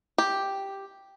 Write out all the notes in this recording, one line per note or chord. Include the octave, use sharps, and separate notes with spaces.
G4